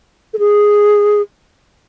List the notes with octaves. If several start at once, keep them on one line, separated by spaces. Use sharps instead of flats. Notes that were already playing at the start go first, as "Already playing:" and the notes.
A4
G#4